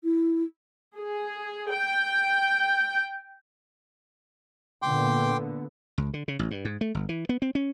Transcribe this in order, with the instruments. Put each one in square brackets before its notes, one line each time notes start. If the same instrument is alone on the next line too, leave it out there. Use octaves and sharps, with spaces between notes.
[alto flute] E4
[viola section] G#4
G5
[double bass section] A#2 D3 B3 [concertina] G5 C6 D6
[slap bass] C#2
D3
C#3
A1
G2
G#2
A3
G1
E3
B3
C4
C#4